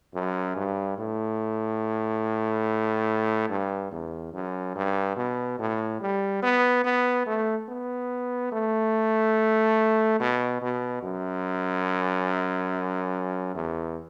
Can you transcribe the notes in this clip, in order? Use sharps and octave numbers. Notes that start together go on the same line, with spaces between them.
F#2
G2
A2
G2
E2
F#2
G2
B2
A2
G3
B3
B3
A3
B3
A3
B2
B2
F#2
E2